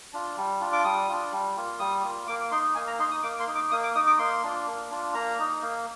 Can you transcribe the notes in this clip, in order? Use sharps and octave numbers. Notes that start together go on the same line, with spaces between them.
D4 F4
G3
D4 F4
D6
G3 D#6
D4 F4
G3
A#3 F4
G3 D#6
A#3 F4
A#3 D6
D#4 C6
A#3 G#5
A#5
D#4 C6
D#6
A#3 D6
C6
D#4
D6
A#3 D#6
D6
D#4 D#6
D6
A#3 C6
D4 F4
A#3
D4 F4
A#3 A#5
D#4
A#3